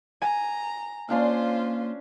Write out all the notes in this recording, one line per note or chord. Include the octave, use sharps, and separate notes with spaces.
G#5 A#5
A#3 C#4 D4 F4 C5 F5